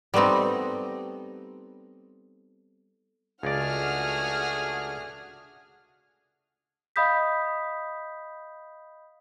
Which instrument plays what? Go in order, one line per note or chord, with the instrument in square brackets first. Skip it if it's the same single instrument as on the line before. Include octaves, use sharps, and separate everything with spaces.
[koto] G3 A3 B3 C4 D#4
[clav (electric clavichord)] C#2 D5 [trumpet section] A3 D4 G#4 [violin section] F#4 F#5 F6
[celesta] D#5 F5 B5 D#6 G6 B6